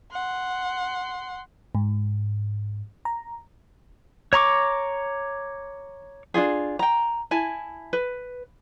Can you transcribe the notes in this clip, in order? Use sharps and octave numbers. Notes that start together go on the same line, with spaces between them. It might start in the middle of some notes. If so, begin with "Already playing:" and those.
F#5 C6
G#2
A#5
C#5 A#5 C#6 D6
D4 D#4 F4 G#4
G5 A#5
E4 G#5 A5
B4